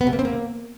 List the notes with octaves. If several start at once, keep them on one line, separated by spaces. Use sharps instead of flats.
B3
C3
A#3
C4
A#3